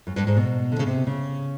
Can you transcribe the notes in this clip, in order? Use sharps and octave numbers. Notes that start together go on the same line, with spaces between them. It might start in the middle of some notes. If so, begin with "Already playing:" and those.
F#2
G2
G#2
B2
D3
C#3
C3
C#3